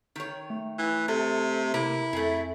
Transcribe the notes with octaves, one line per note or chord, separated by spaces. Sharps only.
D#3 C#5
A3
E3
C3 A4
C3 A#3 E4 A#4
F2 A3 G#4